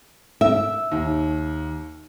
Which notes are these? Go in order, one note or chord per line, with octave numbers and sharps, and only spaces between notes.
E5
D#2